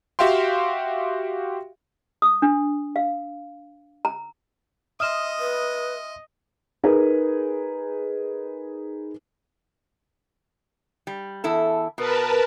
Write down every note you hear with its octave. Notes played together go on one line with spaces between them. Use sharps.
F#4 G4 E5 F5 G5 C6
D#6
D4
F5
A#5
D#5 E5 C6 D#6 F6 E7
B4
D#4 G#4 A#4 B4
G3
E2 E4 A4
B2 A#4 B4 A5